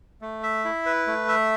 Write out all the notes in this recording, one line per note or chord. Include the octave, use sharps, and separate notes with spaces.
A3
E5
E4
B4
A3
E5